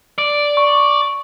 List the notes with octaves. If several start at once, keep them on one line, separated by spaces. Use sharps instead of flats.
D5
C#6